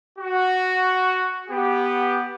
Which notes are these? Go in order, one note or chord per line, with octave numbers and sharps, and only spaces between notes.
F#4
B3 G4